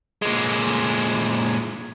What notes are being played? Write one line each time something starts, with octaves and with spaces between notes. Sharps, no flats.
A#2 G#3